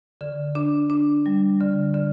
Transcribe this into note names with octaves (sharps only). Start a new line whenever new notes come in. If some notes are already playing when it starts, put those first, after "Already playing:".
D3
D4
D4
G3
D3
D3